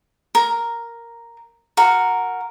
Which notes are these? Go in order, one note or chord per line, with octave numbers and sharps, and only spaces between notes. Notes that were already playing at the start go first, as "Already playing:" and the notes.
A#4 A#5
F#4 A#4